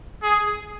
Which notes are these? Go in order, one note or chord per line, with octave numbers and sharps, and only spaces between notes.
G#4